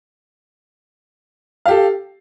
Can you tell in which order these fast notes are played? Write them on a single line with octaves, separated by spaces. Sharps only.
F5 G4 A4